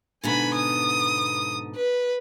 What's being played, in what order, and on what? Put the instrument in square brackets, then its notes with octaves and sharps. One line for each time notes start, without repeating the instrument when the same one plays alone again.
[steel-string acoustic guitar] G#2 B2 D3 [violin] G#5 B5
[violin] D#6
B4